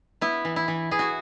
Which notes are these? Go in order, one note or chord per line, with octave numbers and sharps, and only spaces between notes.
B3 E4
E3
E4
E3
E3 G#4
F#4